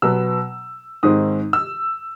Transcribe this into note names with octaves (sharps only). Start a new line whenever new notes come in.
B2 F#3 B3 E6
G#2 D#3 G#3 C4 D#6
E6